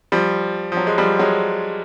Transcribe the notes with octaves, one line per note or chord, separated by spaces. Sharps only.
F3 G3
F3
F#3
G#3
F3 G3
F#3 G#3